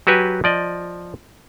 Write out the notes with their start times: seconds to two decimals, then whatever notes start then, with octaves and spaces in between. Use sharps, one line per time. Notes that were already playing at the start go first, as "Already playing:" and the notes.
0.07 F#3 F#4 G4 B4 G#5
0.44 F3 D5 D#5